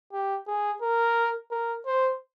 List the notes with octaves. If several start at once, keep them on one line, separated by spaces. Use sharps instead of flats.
G4
G#4
A#4
A#4
C5